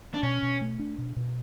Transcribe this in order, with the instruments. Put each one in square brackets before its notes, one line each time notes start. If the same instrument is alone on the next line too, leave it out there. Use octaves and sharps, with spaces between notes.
[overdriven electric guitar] D4
[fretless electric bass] B2 [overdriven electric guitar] C#4
[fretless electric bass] B2
A3
D4
B2
B2